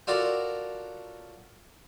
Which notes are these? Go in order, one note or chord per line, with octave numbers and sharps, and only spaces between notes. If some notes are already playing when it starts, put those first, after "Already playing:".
F4 F#4 A4 A#4 C#5 D5